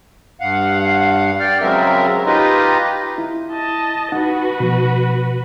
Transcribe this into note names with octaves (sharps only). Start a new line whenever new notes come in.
G2 F5 F#5
D5 G5 F6
C#3 F#3 G#3 C4 A#4 E5
D#4 F4 G4 B4 D#5
E4
D#5 A5
D#4 F#4 B4 F#5
B2 F3